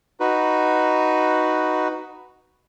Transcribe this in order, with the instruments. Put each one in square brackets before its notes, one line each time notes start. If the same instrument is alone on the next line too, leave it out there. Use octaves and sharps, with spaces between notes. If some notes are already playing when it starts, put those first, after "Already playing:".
[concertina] D#4 F#4 B4